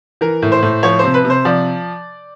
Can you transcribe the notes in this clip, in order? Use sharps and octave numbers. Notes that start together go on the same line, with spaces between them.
E3 A#4
A2
C5
A2
F3 C#5
C3 C5
B4
C3
C5
F3 D5